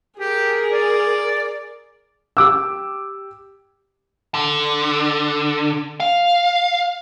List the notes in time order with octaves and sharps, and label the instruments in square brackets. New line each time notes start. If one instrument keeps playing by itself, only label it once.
[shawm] G4 [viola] G#4 A#4
[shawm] D5
[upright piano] G4 D6 E6
[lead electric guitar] D3
F5